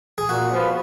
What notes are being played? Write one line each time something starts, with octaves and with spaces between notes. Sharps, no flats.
G#4
A#2 F#4
F3 B3